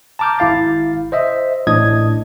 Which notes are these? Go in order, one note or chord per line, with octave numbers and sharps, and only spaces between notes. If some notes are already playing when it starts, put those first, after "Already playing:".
A5 A#5 D6 F6 G6
G#1 E4 F5 A6
C5 D#5 E5
A1 A2 D4 D#5 D#6 G#6